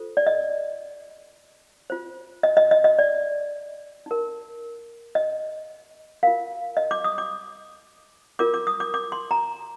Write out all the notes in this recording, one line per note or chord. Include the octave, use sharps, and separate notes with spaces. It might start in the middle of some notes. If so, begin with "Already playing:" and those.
Already playing: F4 A4 C5
D5
D#5
F4 C5
D#5
D#5
D#5
D#5
D5
D#4 A#4
D#5
F4 A#4 F5
D#5
D6
D#6
D6
F4 A#4 D6
D6
D#6
D6
D6
C6
A#5